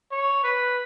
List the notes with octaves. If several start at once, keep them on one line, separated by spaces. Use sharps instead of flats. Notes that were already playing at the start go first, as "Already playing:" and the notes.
C#5
B4